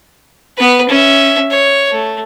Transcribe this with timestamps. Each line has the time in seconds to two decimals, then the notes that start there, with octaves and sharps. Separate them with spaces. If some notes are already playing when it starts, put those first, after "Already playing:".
0.58 B3 B4
0.88 C#4 E5
1.51 C#5
1.91 A3